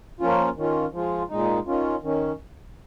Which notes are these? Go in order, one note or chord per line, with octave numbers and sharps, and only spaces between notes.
F3 A#3 C#4 F4
D#3 C#4 F4
F3 G#3 F4
A#2 G#3 D#4
D#3 C#4 F4
D#3 C#4